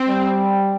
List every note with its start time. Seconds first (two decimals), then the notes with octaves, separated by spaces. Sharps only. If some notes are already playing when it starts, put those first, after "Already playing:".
Already playing: C4
0.08 G3